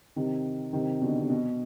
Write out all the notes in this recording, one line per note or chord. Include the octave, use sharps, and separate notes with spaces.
C3 D#3
C3 D#3
B2 D3
C3
B2